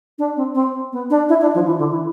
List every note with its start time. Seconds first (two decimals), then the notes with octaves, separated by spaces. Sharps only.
0.18 D4
0.36 C4
0.54 C4
0.92 B3
1.10 D4
1.29 E4
1.41 D4
1.54 F3
1.66 E3
1.78 D3
1.90 E3